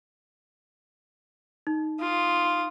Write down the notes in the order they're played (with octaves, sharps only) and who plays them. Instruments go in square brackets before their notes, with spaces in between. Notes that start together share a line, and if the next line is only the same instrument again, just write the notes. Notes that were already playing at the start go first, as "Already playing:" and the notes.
[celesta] D#4
[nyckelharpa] F4 D#6